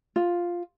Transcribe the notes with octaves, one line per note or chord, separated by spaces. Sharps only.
F4